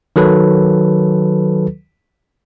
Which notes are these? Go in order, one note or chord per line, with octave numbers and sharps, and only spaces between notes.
D#3 F#3 A4 B4